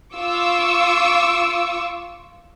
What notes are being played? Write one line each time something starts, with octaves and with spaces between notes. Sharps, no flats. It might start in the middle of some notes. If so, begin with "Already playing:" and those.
F4 C#6 D6 E6